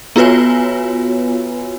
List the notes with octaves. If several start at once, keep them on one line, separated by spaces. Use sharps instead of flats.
B3 F4 F#4 B4 C#5 G#5